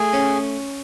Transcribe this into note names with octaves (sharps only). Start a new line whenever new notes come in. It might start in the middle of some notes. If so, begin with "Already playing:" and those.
Already playing: A3 G#4
C#4